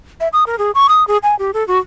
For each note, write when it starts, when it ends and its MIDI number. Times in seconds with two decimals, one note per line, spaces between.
0.20 0.28 76
0.33 0.44 87
0.47 0.58 70
0.58 0.71 68
0.75 0.87 85
0.89 1.06 87
1.08 1.17 68
1.23 1.38 80
1.39 1.51 67
1.54 1.66 69
1.68 1.78 66